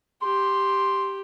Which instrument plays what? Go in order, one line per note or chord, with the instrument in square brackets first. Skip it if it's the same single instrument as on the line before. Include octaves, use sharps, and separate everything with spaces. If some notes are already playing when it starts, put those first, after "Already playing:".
[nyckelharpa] G4 [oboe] C6